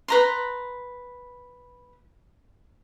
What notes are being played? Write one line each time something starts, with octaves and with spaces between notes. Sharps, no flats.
B4 A#5 C6